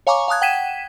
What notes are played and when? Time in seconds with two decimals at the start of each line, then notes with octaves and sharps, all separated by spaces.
0.07 C#5 F5 G#5 A#5 C#6 D6
0.28 F5 A5 D#6 F#6 G#6
0.42 F#5 G5 G#6 B6 D#7 E7